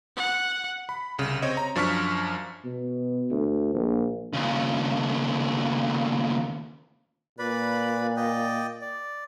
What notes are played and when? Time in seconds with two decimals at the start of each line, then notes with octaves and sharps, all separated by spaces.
0.17 F#5
0.89 B5
1.18 C2 C#3
1.42 C4 C#5 D#5
1.57 A#5
1.75 F#2 F3 D4 C#6 F6 B6
2.65 B2
3.30 D2
3.74 A#1
4.33 D#2 C#3
7.39 A#2 B4 D5 B5
8.16 D5 D#5 G5
8.81 D5